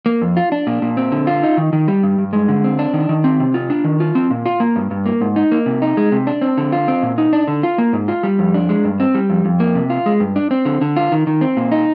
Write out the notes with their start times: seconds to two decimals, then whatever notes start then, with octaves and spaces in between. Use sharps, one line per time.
0.06 A#3
0.22 F2
0.37 F4
0.52 D4
0.67 A#2
0.82 A#2
0.97 C4
1.12 D3
1.27 F4
1.43 D#4
1.57 D#3
1.73 D#3
1.88 G3
2.03 G2
2.18 G2
2.33 G#3
2.48 D3
2.64 C4
2.79 D4
2.94 D#3
3.09 D#3
3.24 C4
3.40 C3
3.54 F4
3.70 D4
3.84 D#3
4.00 F4
4.15 C4
4.30 A#2
4.46 F4
4.60 A#3
4.76 G2
4.91 G2
5.06 A#3
5.21 G#2
5.36 D#4
5.52 A#3
5.66 C3
5.82 D#4
5.97 G#3
6.12 C3
6.27 D4
6.41 C4
6.58 D3
6.72 F4
6.88 C4
7.03 A#2
7.18 D#4
7.33 D4
7.48 D3
7.63 F4
7.78 A#3
7.93 G#2
8.08 F4
8.23 G3
8.39 F2
8.54 D4
8.69 G#3
8.85 G2
9.00 C4
9.15 G3
9.30 F2
9.45 F2
9.60 A#3
9.75 C3
9.90 F4
10.06 G#3
10.20 G2
10.36 D4
10.51 C4
10.65 D3
10.81 D3
10.96 F4
11.12 D#3
11.27 D#3
11.41 C4
11.57 A#2
11.72 D#4